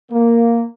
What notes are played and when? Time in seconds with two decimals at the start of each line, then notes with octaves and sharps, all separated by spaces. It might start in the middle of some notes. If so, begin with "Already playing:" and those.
0.11 A#3